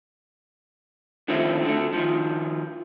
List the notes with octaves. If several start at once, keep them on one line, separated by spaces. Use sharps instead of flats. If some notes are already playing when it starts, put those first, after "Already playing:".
D3 D#3 F3 A3 C4 E4
D3 A3
D#3 F3